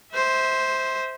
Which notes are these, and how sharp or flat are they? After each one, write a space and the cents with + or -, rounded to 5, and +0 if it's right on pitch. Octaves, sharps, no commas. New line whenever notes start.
C5 +0 E5 -30